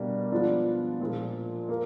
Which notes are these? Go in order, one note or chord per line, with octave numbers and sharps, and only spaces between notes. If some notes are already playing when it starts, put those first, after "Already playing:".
Already playing: B2 G3 A#3 D4
F3 G#3 B3 D4 F4
A#2 F3 G#3
A#3